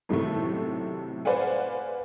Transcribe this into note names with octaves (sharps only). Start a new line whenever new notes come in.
B1 A2 C3 D#3 A3
B4 C5 D5 F5 F#5 G#5